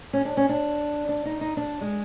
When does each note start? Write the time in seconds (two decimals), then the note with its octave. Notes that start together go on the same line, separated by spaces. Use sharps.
0.13 C#4
0.25 D4
0.37 C#4
0.49 D4
1.09 D4
1.25 D#4
1.41 D#4
1.57 D4
1.81 G#3